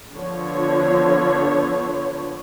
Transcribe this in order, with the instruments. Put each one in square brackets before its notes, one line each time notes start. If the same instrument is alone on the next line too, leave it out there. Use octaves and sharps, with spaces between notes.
[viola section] D3 F3 B3 C#5